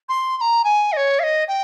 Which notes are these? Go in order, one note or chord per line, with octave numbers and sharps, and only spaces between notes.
C6
C6
A#5
G#5
D#5
C#5
F5
D#5
G5